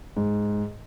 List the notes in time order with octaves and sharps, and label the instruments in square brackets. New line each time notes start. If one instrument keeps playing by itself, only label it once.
[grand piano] G#2